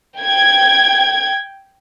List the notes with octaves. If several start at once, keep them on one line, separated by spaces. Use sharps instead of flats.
G5 G#6